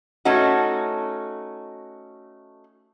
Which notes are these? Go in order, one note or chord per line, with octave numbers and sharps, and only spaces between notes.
A3 C#4 D#4 F#4